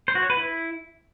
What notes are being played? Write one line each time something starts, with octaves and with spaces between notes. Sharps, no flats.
C5
F#4
C#5
B4
E4